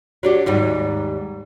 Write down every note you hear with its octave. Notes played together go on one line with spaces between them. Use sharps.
F#3 D4 G4
D#2 G#2 G3